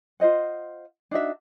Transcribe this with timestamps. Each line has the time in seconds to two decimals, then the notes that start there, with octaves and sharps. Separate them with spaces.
0.20 F4 C5 D#5 F#5
1.11 D4 D#4 F#4 E5